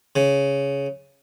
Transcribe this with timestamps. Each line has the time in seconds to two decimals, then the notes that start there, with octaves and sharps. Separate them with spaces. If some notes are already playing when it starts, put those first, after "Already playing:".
0.16 C#3